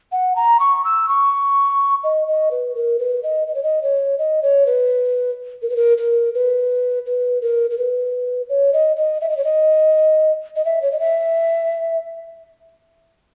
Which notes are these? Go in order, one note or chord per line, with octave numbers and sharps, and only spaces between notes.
F#5
A#5
C#6
E6
C#6
D#5
D#5
B4
A#4
B4
D#5
D#5
C#5
D#5
C#5
D#5
C#5
B4
A#4
B4
A#4
A#4
B4
B4
A#4
A#4
B4
C#5
D#5
D#5
E5
D#5
C#5
D#5
D#5
E5
C#5
D#5
E5